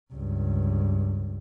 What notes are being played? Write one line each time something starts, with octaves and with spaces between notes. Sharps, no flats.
C#2 G2